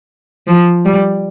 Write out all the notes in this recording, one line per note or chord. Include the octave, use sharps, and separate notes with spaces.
F3
G3